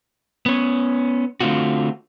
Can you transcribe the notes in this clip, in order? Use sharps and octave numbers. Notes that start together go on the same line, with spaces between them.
B3 C#4
D3 A3 A#3 C4 F4 F#4